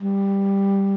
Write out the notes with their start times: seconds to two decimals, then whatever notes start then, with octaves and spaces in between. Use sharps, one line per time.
0.01 G3